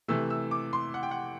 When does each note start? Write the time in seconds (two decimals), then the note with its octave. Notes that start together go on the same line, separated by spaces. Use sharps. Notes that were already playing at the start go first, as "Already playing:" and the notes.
0.08 C3 E3 A3 E6
0.30 E6
0.51 D6
0.73 C6
0.94 F#5
1.03 G5
1.11 F#5